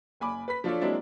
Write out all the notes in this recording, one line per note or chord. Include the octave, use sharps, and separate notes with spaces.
F#1 G#5 B5 D6
B4 B5 B6
F3 D4 F4 A4 C#5 D5
F#3 G#3 A#3 C4 D4 E4